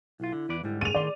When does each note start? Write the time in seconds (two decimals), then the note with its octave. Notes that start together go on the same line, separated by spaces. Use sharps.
0.20 B1 E4 F4
0.32 D3
0.49 E2 B4 D5
0.63 G#2 D3 G3 E4
0.81 G#4 D#7 F7
0.95 A2 D#3 D5 C6